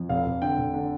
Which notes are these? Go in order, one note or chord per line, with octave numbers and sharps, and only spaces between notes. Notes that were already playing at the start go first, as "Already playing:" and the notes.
Already playing: F2
F1 F5
F1
D3 G5
F1
D3